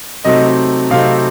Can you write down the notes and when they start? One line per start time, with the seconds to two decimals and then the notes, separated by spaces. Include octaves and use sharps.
0.25 C3 F#3 A3 C4 D#4 D#5
0.90 C3 F#3 A3 C4 D#4 F5